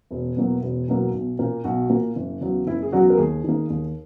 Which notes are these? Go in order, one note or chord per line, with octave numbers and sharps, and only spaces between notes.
E1
E2 B2 F#3 A#3
E1
E2 B2 F#3 A#3
B1
A#2 A#3
B1 F#4
A#2 A#3
F#1
E2 C#3 F#3
F#1 E4
G#4
E2 C#3 F#3 F#4
A#4
D#2 G#4
D#3 A#3
D#2